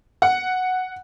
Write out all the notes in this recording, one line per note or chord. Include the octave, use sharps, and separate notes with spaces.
F#5